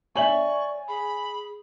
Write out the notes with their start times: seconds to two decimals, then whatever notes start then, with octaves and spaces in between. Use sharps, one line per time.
0.16 C#5 D5 E5 G#5 C#6 F#7
0.88 G#4 B5